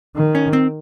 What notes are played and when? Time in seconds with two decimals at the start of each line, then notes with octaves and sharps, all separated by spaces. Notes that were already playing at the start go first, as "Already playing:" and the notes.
0.16 D#3
0.35 C#4
0.53 C4